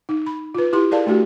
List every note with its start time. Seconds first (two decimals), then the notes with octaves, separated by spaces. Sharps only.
0.09 D#4
0.26 B5
0.55 F4 B4
0.73 E4 G4 C6
0.91 G#4 A#4 D5 F5 A5
1.06 A3 D4 F#4 G4